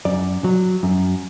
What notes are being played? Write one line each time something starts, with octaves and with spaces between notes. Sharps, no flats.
F#2 D5
F#3
F#2